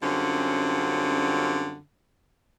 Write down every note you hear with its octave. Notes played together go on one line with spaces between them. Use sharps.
F#2 D3 G3 C4 C#4 F4